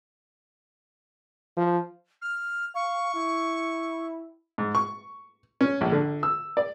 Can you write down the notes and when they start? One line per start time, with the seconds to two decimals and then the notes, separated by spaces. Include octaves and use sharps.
1.57 F3
2.22 F6
2.75 F5 C#6
3.14 E4
4.58 G#2
4.75 C#6
5.61 C#4
5.81 A#1
5.92 D3
6.23 E6
6.57 D5